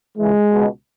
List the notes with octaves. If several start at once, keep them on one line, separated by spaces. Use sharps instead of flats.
C#2 C#3 E3 G#3
C#2 B2